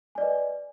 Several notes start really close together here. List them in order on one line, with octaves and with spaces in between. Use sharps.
G#5 D5 D#5 B4